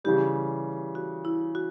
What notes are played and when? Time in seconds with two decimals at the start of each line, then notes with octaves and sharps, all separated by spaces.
0.04 C#3 E3 G3 G4
0.95 F#4
1.25 E4
1.55 F#4